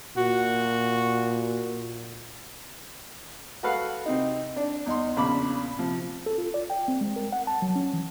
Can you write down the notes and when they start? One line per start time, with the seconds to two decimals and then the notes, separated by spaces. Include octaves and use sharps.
0.17 A#2 F#4
3.63 F#4 A4 B4 F5 F#5
4.06 C3 C4 D#4
4.56 D4
4.86 E2 D#4 C6
5.16 A#1 E2 C#3 B5 D6
5.78 C3 F3
6.26 A4
6.38 F4
6.54 D5
6.70 G5
6.88 C4
7.01 G#3
7.16 A#4
7.32 F#5
7.47 A5
7.62 F#3
7.76 C#4
7.93 E3